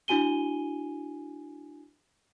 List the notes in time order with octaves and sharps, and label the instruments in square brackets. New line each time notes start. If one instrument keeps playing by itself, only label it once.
[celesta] D4 E4 F#4 G#5 D#7 G7